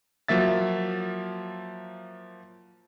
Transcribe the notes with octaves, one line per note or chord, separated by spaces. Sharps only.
F3 F#3 A#3 E5 A6